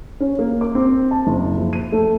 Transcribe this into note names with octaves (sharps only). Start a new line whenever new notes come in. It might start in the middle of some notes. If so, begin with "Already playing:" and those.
C#4
A#3
D6
C4
A5
F#1
F3
D#7
A3